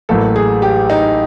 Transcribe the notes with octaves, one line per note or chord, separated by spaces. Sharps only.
A1 A2 F#3 A#3 A4
G#4
G4
D#4